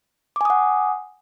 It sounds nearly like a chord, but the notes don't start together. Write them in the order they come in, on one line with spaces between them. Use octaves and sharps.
D6 G#5 D#6 F#5